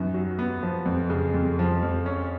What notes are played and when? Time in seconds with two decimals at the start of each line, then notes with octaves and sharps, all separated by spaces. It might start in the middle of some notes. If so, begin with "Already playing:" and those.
Already playing: F#2 D#3 B3
0.14 F#3
0.39 B3
0.63 F3
0.86 F2
1.10 C#3
1.34 F2
1.59 F3
1.83 F2
2.06 C#4